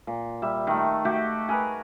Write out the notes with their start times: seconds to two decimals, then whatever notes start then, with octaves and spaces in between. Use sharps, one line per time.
0.07 A#2
0.42 G3 E5
0.67 D#3 A3
1.05 A3 F#4 G4
1.49 G#4 A#4 B4